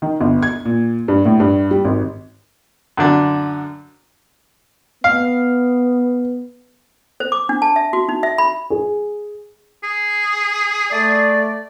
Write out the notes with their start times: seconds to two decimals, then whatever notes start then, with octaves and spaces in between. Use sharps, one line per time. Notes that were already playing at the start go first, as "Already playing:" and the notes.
0.02 D#3
0.21 G1
0.43 G#6
0.65 A#2
1.08 G2
1.26 A2
1.40 G2
1.71 G3
1.85 G#1
2.97 F#2 D3 D4
5.04 B3 F5
7.20 C5
7.32 D6
7.49 D4
7.62 A5
7.76 E5
7.93 F#4
8.09 D#4
8.23 E5
8.38 B5
8.70 G#4
9.83 G#4
10.92 A3 D5